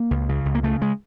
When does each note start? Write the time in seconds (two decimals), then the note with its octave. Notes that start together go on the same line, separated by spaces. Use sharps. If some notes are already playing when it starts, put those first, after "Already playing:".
Already playing: A#3
0.11 C#2
0.29 C#3
0.46 C#2
0.55 A#3
0.63 C#3 A3
0.82 G#3